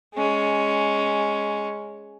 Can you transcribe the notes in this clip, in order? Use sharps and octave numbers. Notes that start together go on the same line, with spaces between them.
G#3 C#4